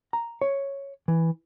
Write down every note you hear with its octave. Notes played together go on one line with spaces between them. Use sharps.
A#5
C#5
E3